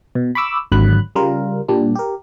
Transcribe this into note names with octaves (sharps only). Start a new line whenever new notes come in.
B2
B5 C#6 D6 E6
G#1 D3 F#3 B5 F#6
C#3 G3 F4 A#4
A#2 G3 D4
G4 A#4